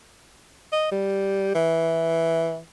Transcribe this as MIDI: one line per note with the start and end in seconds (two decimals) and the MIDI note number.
0.72 0.89 75
0.91 1.53 55
1.55 2.60 52